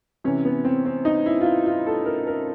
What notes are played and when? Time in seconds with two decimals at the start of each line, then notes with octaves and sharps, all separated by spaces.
0.24 C3 E3 C#4
0.45 B3
0.65 C4
0.85 C4
1.05 D#4
1.26 E4
1.41 F4
1.45 E4
1.66 F4
1.86 A4
2.06 A#4
2.27 A#4